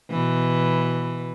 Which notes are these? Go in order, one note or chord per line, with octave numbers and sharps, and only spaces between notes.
B2 E3